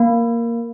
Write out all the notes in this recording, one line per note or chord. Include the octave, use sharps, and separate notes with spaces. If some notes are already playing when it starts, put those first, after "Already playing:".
Already playing: A#3